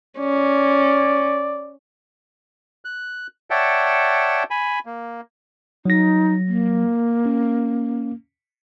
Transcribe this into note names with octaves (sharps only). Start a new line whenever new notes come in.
C#4 D5
F#6
C#5 D5 E5 F#5 G5 A5
G#5 B5
A#3
F#3 D#4 A#6
A#3
C#4